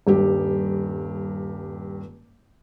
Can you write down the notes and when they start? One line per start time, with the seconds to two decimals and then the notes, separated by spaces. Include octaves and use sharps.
0.07 D#1 G2 G4